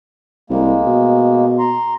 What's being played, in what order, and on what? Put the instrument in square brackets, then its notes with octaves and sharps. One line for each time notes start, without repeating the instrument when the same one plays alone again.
[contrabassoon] C2 [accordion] G#3 A#3
[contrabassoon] B2
[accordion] A#5 C6